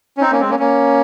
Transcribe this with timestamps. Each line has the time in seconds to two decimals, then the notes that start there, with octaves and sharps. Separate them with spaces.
0.17 C#4
0.21 C4 D#4
0.31 A#3 C#4
0.40 G#3 C4
0.49 A#3 C#4
0.59 A#3 C#4